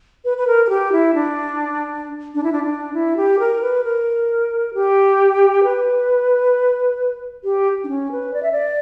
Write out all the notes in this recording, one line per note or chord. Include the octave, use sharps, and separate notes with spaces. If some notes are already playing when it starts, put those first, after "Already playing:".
B4
B4
A#4
A#4
G4
E4
D4
D4
E4
D4
D4
E4
G4
A#4
B4
A#4
G4
B4
G4
D4
C#4
B4
D5
E5
D5